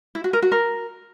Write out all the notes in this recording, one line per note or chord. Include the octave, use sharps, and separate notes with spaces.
E4
F#4
A#4
F#4
A#4